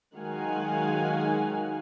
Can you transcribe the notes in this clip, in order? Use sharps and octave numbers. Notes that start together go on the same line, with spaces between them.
D#3 F#3 G#3 F5 F#5 G#5